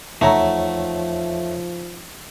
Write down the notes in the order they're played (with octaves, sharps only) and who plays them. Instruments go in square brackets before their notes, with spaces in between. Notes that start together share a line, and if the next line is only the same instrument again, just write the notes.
[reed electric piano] E2 C#5 E5 [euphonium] F3 [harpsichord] A3 [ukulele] D#4 F#5 A#5